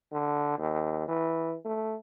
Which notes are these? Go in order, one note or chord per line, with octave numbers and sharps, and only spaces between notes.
D3
D#2
E3
A3